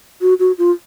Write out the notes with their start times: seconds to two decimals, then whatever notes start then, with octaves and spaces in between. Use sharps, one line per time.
0.21 F#4
0.39 F#4
0.58 F4